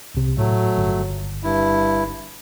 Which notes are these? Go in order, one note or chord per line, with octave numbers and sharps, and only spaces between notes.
C2 C3
A2 F#3 A3
G1
G2 E4